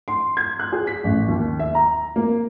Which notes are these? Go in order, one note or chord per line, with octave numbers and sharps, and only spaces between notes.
C6
G#6
F#6
G#4
B6
A1
D#2
E5
A#5
A#3